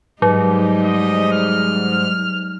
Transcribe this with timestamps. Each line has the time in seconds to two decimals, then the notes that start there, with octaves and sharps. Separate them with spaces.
0.22 G#2 F#3 G3 D#4
0.84 D#5
1.32 F6